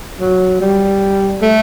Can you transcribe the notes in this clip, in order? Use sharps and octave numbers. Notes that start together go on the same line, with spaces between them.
F#3
G3
A3